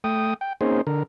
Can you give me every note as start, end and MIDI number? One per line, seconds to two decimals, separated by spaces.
0.04 0.34 57
0.04 0.34 79
0.04 0.34 87
0.41 0.53 79
0.61 0.81 58
0.61 0.81 60
0.61 0.81 61
0.61 0.81 63
0.61 0.81 68
0.61 0.81 72
0.87 1.03 50
0.87 1.03 70